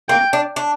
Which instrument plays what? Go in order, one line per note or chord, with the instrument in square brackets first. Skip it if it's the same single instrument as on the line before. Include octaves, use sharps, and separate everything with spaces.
[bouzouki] A#3 [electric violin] G5
[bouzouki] D4
D4